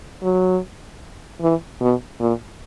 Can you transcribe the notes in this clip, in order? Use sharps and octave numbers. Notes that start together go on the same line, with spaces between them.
F#3
E3
B2
A#2